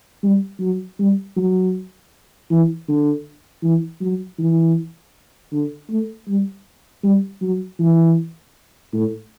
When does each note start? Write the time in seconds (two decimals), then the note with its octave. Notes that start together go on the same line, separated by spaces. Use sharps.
0.23 G3
0.60 F#3
0.99 G3
1.36 F#3
2.50 E3
2.88 D3
3.63 E3
4.01 F#3
4.39 E3
5.52 D3
5.90 A3
6.28 G3
7.03 G3
7.41 F#3
7.79 E3
8.93 A2